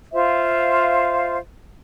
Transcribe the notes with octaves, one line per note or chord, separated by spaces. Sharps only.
F4 C5 E5 F5